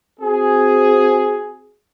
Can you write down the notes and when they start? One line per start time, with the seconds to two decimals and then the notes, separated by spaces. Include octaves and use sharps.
0.20 C4 F#4 G#4